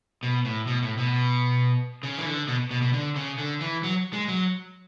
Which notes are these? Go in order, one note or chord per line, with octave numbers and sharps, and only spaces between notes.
B2
A2
B2
A2
B2
C#3
E3
D3
B2
B2
B2
D3
C#3
D3
E3
F#3
G#3
F#3